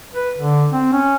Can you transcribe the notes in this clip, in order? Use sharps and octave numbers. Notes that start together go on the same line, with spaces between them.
B4
D3
C4
C#4